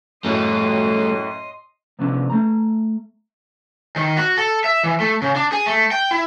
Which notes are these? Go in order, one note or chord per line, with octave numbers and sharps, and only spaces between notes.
F#2 A2 G3 A3 D#5 C6
C3 F3 B3 C#4 D4
A3 A#5
D#3
F#4
A4
E5
E3
A3
C#3
D4
G#4
A3
G5
E4